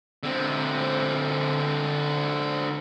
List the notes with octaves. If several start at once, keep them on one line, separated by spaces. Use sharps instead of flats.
D3 C4